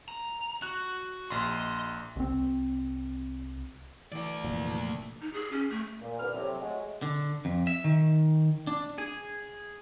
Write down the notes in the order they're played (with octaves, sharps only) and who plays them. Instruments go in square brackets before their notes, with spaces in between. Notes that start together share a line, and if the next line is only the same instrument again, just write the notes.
[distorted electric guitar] A#5
[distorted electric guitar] F#4 [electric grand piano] F#6
[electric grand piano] A#1 C6 [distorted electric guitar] D#5
[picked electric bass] C2 C4
[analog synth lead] E3 [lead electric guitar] A3 D5
[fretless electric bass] F1 A#2
[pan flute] D#4
G#4
C#4
A3
[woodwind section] A#2
C2 D3 B4 F6
A2 C3 F#3
F#3 G#3 A3
[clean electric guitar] D3
F2
E5
D#3
D4
G#4